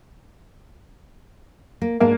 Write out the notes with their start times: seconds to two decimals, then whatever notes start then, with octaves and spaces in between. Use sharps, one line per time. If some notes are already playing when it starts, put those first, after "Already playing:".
1.82 A#3
2.00 G#2 G#3 A#3 D4